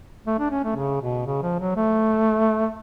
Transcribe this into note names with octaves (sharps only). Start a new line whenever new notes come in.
A3
D4
C#4
A3
C#3
B2
C#3
F3
F#3
A3